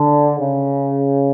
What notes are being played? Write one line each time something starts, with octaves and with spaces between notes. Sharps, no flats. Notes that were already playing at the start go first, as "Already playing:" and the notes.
Already playing: D3
C#3